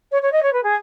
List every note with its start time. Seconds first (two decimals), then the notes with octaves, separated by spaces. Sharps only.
0.11 C#5
0.22 C#5
0.32 D#5
0.43 C#5
0.53 B4
0.63 G#4